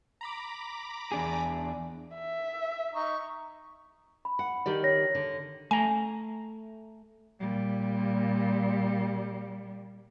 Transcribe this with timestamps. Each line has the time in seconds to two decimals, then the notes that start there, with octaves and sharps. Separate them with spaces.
0.21 A#5 B5 D6
1.12 E2 D4 G#4
2.14 E5
2.95 D#4 C#6
4.25 B5
4.39 F#5
4.66 D#3 G4 D5
4.83 C#5 A#6
5.15 D3
5.71 A3 G#5 A#5
7.40 A#2 G3